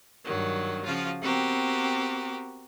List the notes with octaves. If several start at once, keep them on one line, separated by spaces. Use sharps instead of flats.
G2 D#3 F#3
C#3 F3 F4 F#4
B3 C4 F#4 G4 A#4